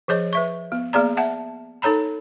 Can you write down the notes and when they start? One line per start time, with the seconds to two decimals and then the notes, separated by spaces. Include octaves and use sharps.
0.08 F3 G#4 C#5 D#5
0.33 B4 E5 C#6
0.72 B3
0.93 A#3 B3 G#4 D5 A#5
1.17 E5 F#5 A5
1.82 D#4 A4 C#5 A#5 B5